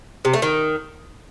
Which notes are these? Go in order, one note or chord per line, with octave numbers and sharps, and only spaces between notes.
C3
A3
D#3